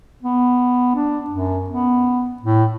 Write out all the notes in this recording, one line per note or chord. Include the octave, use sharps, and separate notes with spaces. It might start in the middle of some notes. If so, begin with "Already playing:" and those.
B3
D4
F#2
B3
A2